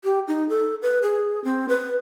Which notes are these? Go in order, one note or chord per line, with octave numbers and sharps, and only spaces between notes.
G4
D#4
A4
B4
G#4
C4
B4